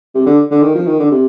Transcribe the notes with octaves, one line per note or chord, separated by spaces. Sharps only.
C3
D3
D3
D#3
F3
D#3
D3
C3